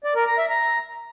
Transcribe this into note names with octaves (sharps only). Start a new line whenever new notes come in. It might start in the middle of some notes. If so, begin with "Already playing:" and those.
D5
A#4
A#5
E5
A#5